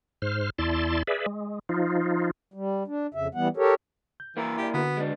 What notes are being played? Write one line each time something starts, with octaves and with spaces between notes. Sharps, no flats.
G#2 C5 F6
E2 E4 D5 A5 C6
G#4 B4 D5 E5
G#3
F3 D#4 F4
G3
D4
F2 C#3 E5
E3 G3 B3 F#5
G4 A4 A#4 C#5
G6
E3 A#3 E4 A#4
G4 D5 G#5 B5
D3 B3 F#4 B4
G#3 D4